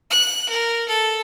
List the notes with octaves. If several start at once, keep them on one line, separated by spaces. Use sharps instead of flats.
F#6
A#4
A4